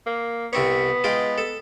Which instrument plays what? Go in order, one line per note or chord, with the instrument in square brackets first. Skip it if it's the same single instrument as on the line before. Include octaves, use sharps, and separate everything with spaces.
[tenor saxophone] A#3
[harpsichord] C2 C4 C#5 [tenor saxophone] B3
[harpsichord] G#3 F4 G5
A4